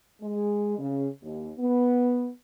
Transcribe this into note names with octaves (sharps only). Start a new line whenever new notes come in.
G#3
C#3
D#2
B3